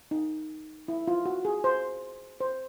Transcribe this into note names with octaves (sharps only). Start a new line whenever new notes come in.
D#4
E4
F4
F#4
G#4
C5
C5